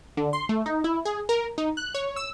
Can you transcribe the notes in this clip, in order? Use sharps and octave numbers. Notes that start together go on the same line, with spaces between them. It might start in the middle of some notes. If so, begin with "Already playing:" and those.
D3
C6
A3
D#4
E4
G#4
A#4
D#4
F#6
C#5
E6